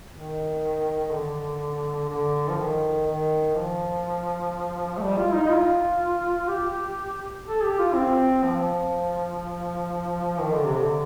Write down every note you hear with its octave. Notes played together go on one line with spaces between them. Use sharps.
D#3
D3
D3
F3
D#3
D#3
F3
A3
G3
F4
D#4
F4
G4
A4
G4
F4
C4
F3
D#3
D3
C3
D3